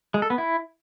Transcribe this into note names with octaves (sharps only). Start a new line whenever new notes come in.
G#3
A4
B3
E4